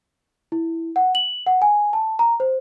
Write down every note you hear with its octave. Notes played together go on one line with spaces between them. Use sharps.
E4
F#5
F#7
F#5
G#5
A5
A#5
C5